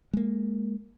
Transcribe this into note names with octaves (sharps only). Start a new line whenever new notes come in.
G#3 A#3